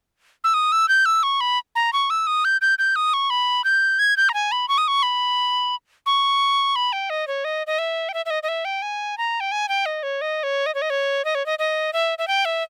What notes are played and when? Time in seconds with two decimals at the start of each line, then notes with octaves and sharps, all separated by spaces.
0.44 E6
0.54 D#6
0.72 E6
0.89 G6
1.06 E6
1.23 C#6
1.41 B5
1.75 A#5
1.93 C#6
2.10 E6
2.27 D#6
2.45 G6
2.61 G6
2.79 G6
2.96 D#6
3.14 C#6
3.30 B5
3.64 G6
3.99 G#6
4.17 G6
4.29 A#5
4.34 G#5
4.52 B5
4.68 C#6
4.78 D#6
4.88 C#6
5.03 B5
6.06 C#6
6.76 B5
6.93 G5
7.10 D#5
7.27 C#5
7.45 D#5
7.67 D#5
7.79 E5
8.09 G5
8.14 E5
8.26 E5
8.30 D#5
8.43 D#5
8.48 E5
8.65 G5
8.82 G#5
9.18 A#5
9.40 G5
9.52 G#5
9.69 G5
9.86 D#5
10.03 C#5
10.21 D#5
10.43 C#5
10.66 D#5
10.75 C#5
10.82 D#5
10.90 C#5
11.25 D#5
11.35 C#5
11.46 D#5
11.59 D#5
11.93 E5
12.18 E5
12.28 G5
12.45 E5